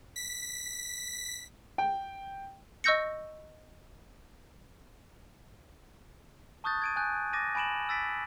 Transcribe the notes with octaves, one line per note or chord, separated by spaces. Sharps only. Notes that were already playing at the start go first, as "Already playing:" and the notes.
B6
G5
D#5 C#6 E6 G6 A#6 C#7
A5 C#6 D#6 F#6 G6 A6
G#6 D7 D#7
G#5 F#6 G6
D6 A6 A#6 D#7
G#5 B5 D7 E7 F#7
E6 A6 B6 D7